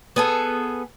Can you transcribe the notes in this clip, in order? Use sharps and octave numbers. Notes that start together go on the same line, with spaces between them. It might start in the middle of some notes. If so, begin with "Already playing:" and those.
B3 G#4 A4